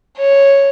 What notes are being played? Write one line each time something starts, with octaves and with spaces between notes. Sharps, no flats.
C#5